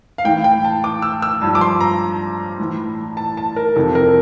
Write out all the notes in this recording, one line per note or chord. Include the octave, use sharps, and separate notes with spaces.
F5
A2 E3 G5
G5
A5
D6
E6
E6
G2 F3
D6
C6
A#5
A2 E3
A5
A5
A#4
F2 C3 E3 A4
A#4